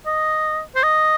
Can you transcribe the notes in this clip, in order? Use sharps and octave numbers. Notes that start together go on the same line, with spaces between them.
D#5
C5
D#5